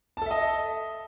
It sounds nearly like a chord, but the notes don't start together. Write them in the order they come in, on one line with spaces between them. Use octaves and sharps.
A5 A4 E5 D#5